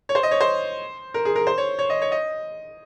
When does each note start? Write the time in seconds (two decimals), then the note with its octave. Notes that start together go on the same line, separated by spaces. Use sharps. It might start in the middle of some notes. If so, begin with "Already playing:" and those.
0.09 C#5
0.15 C5
0.23 D#5
0.31 C#5
0.41 C5
1.14 A#4
1.25 G#4
1.36 A#4
1.47 C5
1.58 C#5
1.79 C#5
1.90 D#5
2.02 C#5
2.12 D#5